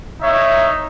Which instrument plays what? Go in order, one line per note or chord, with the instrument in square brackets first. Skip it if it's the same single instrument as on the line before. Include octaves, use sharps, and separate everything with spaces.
[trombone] D#4 [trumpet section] C#5 E5